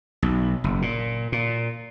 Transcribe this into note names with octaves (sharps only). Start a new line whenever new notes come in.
B1
F#1
A#2
A#2